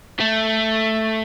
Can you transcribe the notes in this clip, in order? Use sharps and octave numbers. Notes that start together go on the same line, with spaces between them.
A3